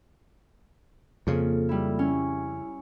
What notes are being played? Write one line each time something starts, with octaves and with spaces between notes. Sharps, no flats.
F2 C#3 A#3 F4 A4
G3 E4
C#4 E4